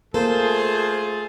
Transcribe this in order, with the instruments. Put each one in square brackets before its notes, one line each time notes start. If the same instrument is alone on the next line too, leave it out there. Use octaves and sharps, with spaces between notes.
[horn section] A3 F4 G#4 [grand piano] A#3 [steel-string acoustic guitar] A4 [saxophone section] C5